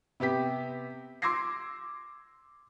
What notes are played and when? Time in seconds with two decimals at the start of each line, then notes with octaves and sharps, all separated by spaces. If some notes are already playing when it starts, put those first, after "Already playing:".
0.20 C3 B3 G4 B6
1.22 C6 D6 E6 G#6 A#6 C7